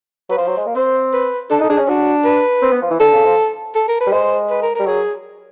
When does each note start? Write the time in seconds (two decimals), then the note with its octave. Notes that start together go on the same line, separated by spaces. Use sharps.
0.30 F#3 B4
0.37 F3 C5
0.47 F#3
0.57 G#3
0.66 A#3
0.75 C4 C5
1.13 B4
1.50 D4 A4
1.60 D#4
1.63 A4
1.69 D4 G#4
1.78 C#4
1.88 D4 F#4
2.25 B4
2.62 C4
2.72 B3
2.82 F3
2.91 E3
3.00 D3 A4
3.13 C#3
3.25 F3
3.75 A4
3.88 A#4
4.00 B4
4.07 G3
4.12 G#3 C5
4.50 B4
4.62 A#4
4.75 A#4
4.79 G3
4.87 F#3 G#4